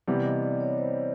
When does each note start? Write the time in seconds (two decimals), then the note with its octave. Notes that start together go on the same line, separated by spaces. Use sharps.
0.07 C3 E3 G3 B3 D5
0.25 D#5
0.43 D5
0.60 C#5
0.78 C5